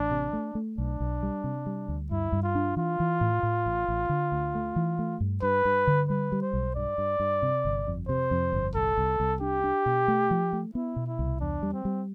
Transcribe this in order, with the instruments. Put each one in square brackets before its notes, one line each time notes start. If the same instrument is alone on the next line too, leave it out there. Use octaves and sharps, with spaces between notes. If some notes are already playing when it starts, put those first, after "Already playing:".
Already playing: [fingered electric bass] A1 [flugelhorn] D4
[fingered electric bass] C3
A3
A3
[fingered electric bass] B1 [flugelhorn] D4
[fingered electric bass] B1
G3
C3
G3
D2
[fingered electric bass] G2 [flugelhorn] E4
[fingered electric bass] G2
[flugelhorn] F4
[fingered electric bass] D4
[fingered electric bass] E3 [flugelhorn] F4
[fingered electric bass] E3
A2
A2
A1
A1
D3
D2
A3
E3
A3
G2
[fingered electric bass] G2 [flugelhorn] B4
[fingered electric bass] G2
D3
[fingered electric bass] G3 [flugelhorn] B4
[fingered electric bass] G3
[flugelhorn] C5
[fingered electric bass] B1
[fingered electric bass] G2 [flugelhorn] D5
[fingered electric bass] G2
G2
C3
G1
F2
[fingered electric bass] C3 [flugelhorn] C5
[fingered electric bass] F2
G1
[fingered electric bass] C2 [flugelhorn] A4
[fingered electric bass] C2
C2
[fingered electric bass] D4 [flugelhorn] G4
[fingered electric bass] D4
B2
A3
F3
A3
[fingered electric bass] B3 [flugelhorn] E4
[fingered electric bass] B2
[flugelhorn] E4
[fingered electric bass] C2
[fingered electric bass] E2 [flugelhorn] D4
[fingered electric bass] G3
[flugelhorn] C4
[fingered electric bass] G3